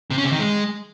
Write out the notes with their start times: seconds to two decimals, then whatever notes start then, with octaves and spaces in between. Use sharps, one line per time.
0.11 C3
0.18 C#4
0.25 C3
0.32 D#3
0.39 G#3